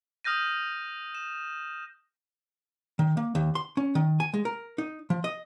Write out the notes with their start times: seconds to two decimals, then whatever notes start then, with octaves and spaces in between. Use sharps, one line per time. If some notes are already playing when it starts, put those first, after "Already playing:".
0.24 D#6 F6 G6 A#6 D#7
1.15 E7
2.99 D#3
3.17 A#3
3.35 D#2
3.55 C6
3.77 C#4
3.95 D#3
4.20 G#5
4.34 G#3
4.45 A#4
4.78 D#4
5.10 F3
5.24 D#5